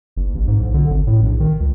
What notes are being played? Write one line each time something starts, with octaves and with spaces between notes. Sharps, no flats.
F#1
A1
G#2
B1
D3
G#1
A2
A#1
D#3
C#2